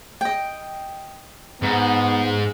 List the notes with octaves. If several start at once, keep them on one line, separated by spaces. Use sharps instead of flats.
D#5 G5
G#2 B3